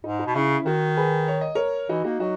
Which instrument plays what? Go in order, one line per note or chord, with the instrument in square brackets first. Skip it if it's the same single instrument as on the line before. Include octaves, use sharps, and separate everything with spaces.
[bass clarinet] G#2 [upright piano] D#4
[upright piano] D#4
[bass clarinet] B2
[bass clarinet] C#3 [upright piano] C#4 E4
[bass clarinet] D#3 [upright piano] F#4 A#4
[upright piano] G#4 B4
C#5
D#5
A#4 C#5
[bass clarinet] E3 [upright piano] D#4 F#4
[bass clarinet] A#3 [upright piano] D#4 F#4
[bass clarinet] F#3 [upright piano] D#4 F#4